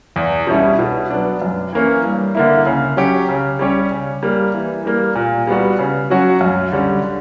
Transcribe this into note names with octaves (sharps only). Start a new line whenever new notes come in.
E2
B2 G3 C#4 E4
B2
F#3 B3 D4
F#2
E3 A#3 C#4
G2
D3 A#3 E4
C#3
F#3 C#4 G4
C#3
G3 C#4 G4 C#5
C#3
G3 A#3
E3
G3 A#3
A#2
G3 B3 F#4
C#3
F#3 C#4 F#4
F#2
D3 G3 C#4
D3